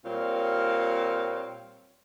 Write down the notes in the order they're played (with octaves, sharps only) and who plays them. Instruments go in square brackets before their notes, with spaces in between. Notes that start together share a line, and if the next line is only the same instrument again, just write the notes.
[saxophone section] A#2 G3 C4 C#5 F5